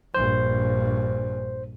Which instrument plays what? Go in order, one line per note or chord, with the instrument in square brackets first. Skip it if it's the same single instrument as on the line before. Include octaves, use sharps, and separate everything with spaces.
[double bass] A#1 G2 [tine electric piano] C5